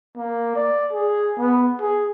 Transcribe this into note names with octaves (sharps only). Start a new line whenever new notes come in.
A#3
D5
G#4
B3
G#4